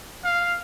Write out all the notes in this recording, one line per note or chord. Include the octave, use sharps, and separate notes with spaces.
F5